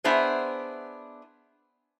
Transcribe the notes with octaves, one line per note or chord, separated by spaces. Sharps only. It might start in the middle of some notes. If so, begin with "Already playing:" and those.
B3 D4 E4 G#4 C5